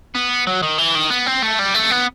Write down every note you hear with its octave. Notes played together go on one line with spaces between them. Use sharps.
B3
F#3
D#3
E3
D#3
B3
C4
A3
G3
A3
B3